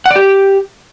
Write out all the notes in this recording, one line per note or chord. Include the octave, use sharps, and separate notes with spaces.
F#5
D5
G4